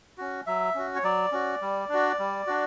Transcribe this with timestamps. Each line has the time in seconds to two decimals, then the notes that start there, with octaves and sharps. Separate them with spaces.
0.18 C#4 F#4
0.46 F#3 E5
0.75 C#4 F#4
0.95 C#5
1.03 F#3 D5
1.32 C#4 F#4
1.62 G3
1.89 D4 F#4
2.19 G3
2.47 D4 F#4